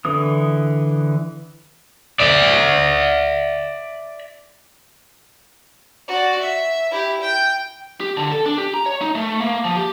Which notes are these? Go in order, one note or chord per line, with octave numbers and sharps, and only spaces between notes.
D3 E3 D#6
D5 E5
F#4 D5
E5
E4 G4
G5
G4
D3
A4
D4
G4
A#5
C#5
D#4
A3
A#3
F3
G4